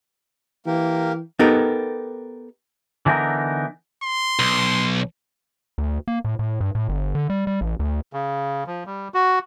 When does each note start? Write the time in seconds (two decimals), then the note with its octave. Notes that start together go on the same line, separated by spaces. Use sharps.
0.66 E3 A#3 G4 A#4
1.39 B3 D#4 G4 A4 A#4
3.05 D3 E3 B3 D#4 A#4
4.03 C6
4.39 B1
5.78 D2
6.08 A#3
6.25 A2
6.39 A2
6.61 G2
6.75 A2
6.89 G1
7.15 D3
7.30 G3
7.47 G3
7.61 A1
7.80 D2
8.13 C#3
8.67 F3
8.86 G3
9.14 F#4